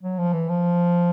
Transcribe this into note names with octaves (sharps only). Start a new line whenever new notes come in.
F#3
F3
E3
F3